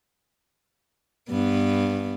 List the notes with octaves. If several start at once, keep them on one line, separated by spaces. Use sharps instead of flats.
G2 B3